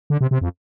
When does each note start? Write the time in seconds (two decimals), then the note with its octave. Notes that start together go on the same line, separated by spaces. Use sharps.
0.10 D3
0.21 C3
0.31 C3
0.41 F2